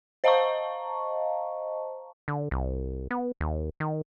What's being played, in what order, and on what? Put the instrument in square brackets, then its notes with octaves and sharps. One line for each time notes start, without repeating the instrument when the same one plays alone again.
[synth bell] C5 D#5 F5 A5 A#5 C#6
[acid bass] D3
C2
B3
D#2
D#3